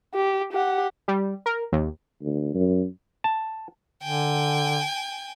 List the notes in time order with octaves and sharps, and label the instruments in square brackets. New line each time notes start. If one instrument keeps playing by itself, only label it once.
[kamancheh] G4
G4 F#5
[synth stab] G3
A#4
D#2
[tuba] D2
F#2
[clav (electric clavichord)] A5
[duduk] D3 [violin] G5 G#5